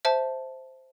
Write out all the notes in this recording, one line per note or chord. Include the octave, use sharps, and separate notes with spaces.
C5 E5 A5